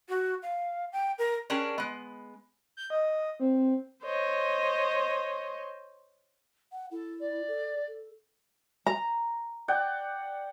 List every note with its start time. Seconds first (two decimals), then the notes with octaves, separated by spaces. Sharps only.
0.09 F#4
0.42 F5
0.93 G5
1.18 A#4
1.50 C#4 D4 G4 G#4 A#4
1.78 G#3 B3
2.77 G6
2.90 D#5
3.40 C4
4.03 C5 C#5 D#5
6.72 F#5
6.91 E4 A4
7.19 D5
7.48 A4
7.88 A4
8.86 A#5
9.68 D5 F#5 G5